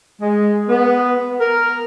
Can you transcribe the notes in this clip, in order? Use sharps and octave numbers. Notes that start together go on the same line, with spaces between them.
G#3
B3
A#4